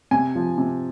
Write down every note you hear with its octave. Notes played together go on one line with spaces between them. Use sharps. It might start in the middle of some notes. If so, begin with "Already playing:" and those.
C3 G#5
F3
C3